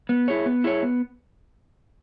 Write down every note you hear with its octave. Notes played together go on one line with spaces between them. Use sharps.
B3
E4 G#4 C#5
B3
E4 G#4 C#5
B3